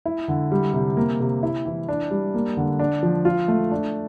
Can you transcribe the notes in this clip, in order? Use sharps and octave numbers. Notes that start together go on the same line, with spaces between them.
E4
D3
G3
C3
A#3
C3
E4
E3
D4
G3
A#3
D3
D4
F3
F4
A3
D4